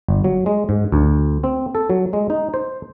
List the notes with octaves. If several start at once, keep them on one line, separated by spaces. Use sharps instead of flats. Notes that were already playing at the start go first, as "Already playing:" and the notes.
G1
F#3
G#3
G#2
D2
C4
A4
F#3
G#3
D#4
C5